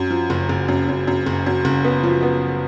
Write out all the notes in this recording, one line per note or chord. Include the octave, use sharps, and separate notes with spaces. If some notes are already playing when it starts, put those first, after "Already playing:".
Already playing: F#2
F3
F#1
F#1
F#2
F#2
F#2
F#1
F#2
F#1
B3
F3
B3